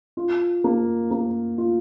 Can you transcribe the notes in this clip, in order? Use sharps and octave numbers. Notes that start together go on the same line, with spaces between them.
F4
A#3
A#3
F4